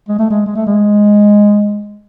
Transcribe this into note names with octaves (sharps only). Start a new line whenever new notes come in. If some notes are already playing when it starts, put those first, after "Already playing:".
G#3
A3
G#3
G#3
A3
G#3